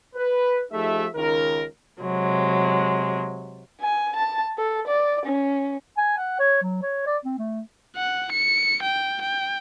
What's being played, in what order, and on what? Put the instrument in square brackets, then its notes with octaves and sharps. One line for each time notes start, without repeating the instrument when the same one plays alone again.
[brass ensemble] B4
F3 A3 D#4 G4 G#4 E5
C#2 D#3 A#4
[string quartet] C3 F#3 G#3
[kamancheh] G#5
A5
A4
D5
C#4
[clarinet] G#5
F#5
C#5
F#3
C#5
D5
C4
A3
[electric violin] F#5
C#7
G5
G5